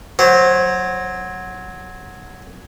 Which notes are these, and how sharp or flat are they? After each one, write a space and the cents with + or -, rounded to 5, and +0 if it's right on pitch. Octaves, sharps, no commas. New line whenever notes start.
F#3 -5 C5 +20